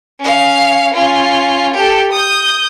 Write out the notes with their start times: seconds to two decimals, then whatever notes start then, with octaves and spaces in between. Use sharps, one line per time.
0.20 C#4 F5
0.94 C#4 F4
1.74 G4 A4
2.12 D#6 G6